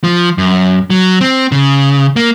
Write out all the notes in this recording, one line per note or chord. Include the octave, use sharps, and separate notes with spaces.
F3
F#2
F#3
C4
C#3
A#3